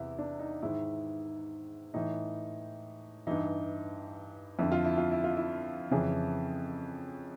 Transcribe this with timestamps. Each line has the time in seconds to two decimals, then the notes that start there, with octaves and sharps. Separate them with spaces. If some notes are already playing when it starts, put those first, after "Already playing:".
Already playing: E2 C3 E4
0.19 D4
0.40 D#4
0.62 G#2 D#3 E4
1.94 A2 E3 D#4
3.27 G2 E3 D#4
4.59 F2 D3 E4
4.72 F4
4.84 E4
4.98 F4
5.11 E4
5.24 F4
5.37 E4
5.91 F2 C#3 E3 G#4